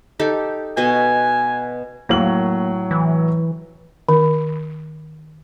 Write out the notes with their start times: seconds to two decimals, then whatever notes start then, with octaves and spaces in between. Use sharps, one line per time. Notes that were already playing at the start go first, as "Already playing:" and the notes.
0.19 D#4 G4 A4
0.77 B2 D#5 G#5 C#6
2.09 A2 F#3 A#3 F#7
2.91 E3
4.09 D#3